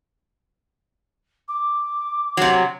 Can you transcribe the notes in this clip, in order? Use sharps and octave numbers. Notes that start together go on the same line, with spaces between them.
D6
C3 F#3